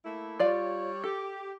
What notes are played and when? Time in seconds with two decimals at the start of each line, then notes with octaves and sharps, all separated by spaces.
0.03 A3 A#3 E4
0.39 G3 F4 C#5 D5 F5
1.04 G4 A4